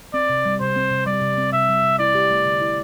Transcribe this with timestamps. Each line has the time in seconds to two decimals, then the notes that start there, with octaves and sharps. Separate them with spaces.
0.14 C4 D5
0.30 C3
0.45 G3
0.61 C3 C5
0.76 C4
0.91 C3
1.06 G3 D5
1.21 C3
1.38 C4
1.53 C3 E5
1.69 G3
1.84 C3
1.99 E4 D5
2.15 G4
2.31 A3
2.46 D3
2.61 E4